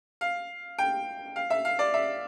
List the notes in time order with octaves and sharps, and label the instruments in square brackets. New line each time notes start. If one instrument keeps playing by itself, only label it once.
[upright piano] F5
G5
F5
E5
F5
D5
E5